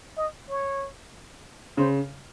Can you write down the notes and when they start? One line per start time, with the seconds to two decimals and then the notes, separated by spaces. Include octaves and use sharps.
0.17 D#5
0.49 C#5
1.77 C#3 C5